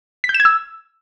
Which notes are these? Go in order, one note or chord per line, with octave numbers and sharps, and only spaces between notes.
B6
G6
E7
G#6
E6